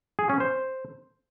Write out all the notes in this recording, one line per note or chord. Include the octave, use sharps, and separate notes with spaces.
G#4
C#4
C5